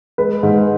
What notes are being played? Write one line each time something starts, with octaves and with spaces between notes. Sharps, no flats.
G#3 B4
G#2